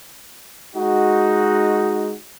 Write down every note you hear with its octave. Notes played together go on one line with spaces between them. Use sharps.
G#3 D#4 F#4